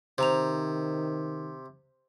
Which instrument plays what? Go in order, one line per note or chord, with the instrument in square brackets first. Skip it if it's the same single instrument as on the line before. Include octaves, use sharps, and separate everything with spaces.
[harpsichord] C3 [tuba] D#3 [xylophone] C5 A#5 F7